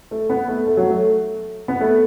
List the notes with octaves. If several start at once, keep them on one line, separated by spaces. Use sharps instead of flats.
A3
B3
A3
A3
F#3
A3
B3
A3